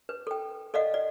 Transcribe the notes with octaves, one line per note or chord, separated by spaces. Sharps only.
B4
A4 G5
A4 D5 D#5 F5 F#5
D5